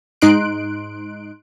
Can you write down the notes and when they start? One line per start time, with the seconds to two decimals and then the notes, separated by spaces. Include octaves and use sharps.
0.21 G#2 D#4 C6 F#6 D7